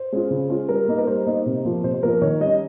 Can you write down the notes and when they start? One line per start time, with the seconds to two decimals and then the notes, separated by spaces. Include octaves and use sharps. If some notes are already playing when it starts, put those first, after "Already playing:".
Already playing: C5
0.12 G#3 C#4 F4
0.31 C#3
0.50 G#3 C#4 F4
0.69 G3 A#4
0.88 A#3 D#4
0.99 A#4
1.07 G3 C5
1.26 A#3 D#4
1.46 C3
1.65 F3 A#3 F4
1.83 C3 C5
1.94 C5
2.03 F3 A#3 F4 A#4
2.22 D#3 C#5
2.41 G3 C#4 D#5